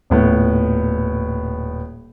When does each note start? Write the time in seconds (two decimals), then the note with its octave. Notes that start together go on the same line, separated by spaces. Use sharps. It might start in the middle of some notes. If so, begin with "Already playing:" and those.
0.10 D#1 A2 B3